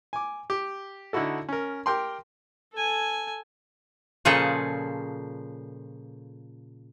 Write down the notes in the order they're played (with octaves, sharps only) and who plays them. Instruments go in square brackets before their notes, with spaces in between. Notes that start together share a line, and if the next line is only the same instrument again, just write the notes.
[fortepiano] G#5 D6
G4
D3 D#4 E4 F#4 A4
C#4 A#4
G4 A#4 G5 C6
[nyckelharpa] A4 G#5
[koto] A#2 C#3 F3 G#4 A4